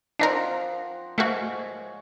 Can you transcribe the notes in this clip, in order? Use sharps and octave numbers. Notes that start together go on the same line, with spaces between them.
F3 C4 D4 D#4 A#4 F#5
G#2 A3 A#3 F#4 C#5